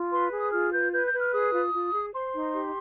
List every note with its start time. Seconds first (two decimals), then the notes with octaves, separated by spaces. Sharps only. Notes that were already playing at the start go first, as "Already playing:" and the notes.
Already playing: F4
0.11 B4 C6
0.31 G#4
0.38 D#6
0.52 F4 F6
0.71 B4 G6
0.92 B4 G6
1.05 G6
1.12 B4
1.19 F6
1.32 G#4 D#6
1.52 F4
1.73 F4
1.93 G#4
2.13 C5 C6
2.33 D#4
2.53 G4